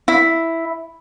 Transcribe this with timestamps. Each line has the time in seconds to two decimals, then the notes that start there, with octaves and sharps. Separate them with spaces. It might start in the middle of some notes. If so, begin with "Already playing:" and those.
0.08 E4